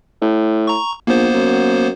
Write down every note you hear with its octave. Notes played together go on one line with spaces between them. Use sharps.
A2
A#5 C#6
A#1 A#3 B3 C5
F#2